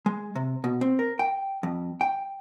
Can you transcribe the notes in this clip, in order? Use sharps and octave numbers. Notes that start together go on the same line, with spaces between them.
G#3
C3
B2
C4
A#4
G5
F2
G5